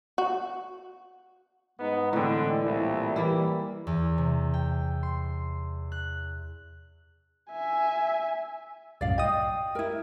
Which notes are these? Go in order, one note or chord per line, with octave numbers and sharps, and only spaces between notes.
F#4
G#2 G#3 B3 D#4
A2 D3 E3 C4
C2 A#2 E4
E3 G3 A#3 E4
E2
C3
G5
C6
F#6
E5 G#5
C2 F#2 A2 D5 F5
D#5 G5 D#6
E4 A#4